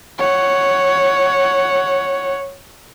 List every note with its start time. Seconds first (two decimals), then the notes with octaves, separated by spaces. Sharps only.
0.18 C#5 F#5